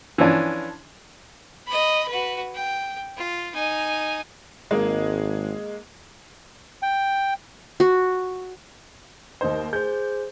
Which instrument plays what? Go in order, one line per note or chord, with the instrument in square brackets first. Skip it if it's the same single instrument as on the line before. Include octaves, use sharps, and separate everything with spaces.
[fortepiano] E3 F3 C#4 D4
[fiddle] D#5 B5
F#4 B4
G5
F4
D#4 G#5
[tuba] G#1 [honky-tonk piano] G#3 A#3
[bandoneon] G5
[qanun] F#4
[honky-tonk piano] D#2 D#4 C5
[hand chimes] G#4 C5 [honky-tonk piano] G6